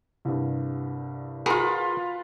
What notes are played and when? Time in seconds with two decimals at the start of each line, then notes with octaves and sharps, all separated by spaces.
0.25 C2 G2
1.46 F4 F#4 G#4 A#4 B4